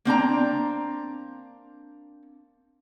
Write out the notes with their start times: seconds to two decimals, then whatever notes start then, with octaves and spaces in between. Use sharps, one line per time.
0.05 A#3 C4 D4 A#5